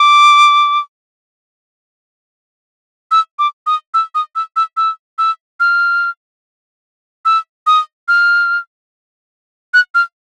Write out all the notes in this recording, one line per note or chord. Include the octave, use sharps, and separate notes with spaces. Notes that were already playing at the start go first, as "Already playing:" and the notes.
Already playing: D6
E6
D6
D#6
E6
D#6
E6
E6
E6
E6
F6
E6
D#6
F6
F#6
F6